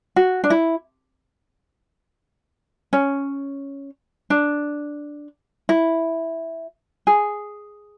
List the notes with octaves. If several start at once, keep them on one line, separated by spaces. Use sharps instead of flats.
F#4
D4
E4
C#4
D4
E4
G#4